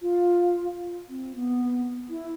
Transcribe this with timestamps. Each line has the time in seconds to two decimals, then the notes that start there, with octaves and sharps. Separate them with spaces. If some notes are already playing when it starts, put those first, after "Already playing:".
0.01 F4
1.09 C4
1.35 B3
2.10 E4